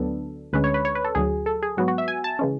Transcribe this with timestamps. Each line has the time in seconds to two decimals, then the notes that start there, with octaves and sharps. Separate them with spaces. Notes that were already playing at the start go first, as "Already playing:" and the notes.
Already playing: D2 D3 F#3 B3 D4 A4
0.53 D2 D3 G#3 C#4 B4
0.64 C#5
0.74 B4
0.85 C#5
0.95 B4
1.05 A4
1.15 D2 D3 F#3 G#4
1.46 A4
1.63 G#4
1.77 G#2 F#3 B3 F#4
1.88 F#4
1.98 E5
2.08 G#5
2.24 A5
2.39 C#3 E3 G#3 C#4